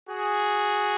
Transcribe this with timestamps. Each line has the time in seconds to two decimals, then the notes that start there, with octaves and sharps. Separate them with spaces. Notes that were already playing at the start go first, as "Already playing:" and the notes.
0.09 F#4 G#4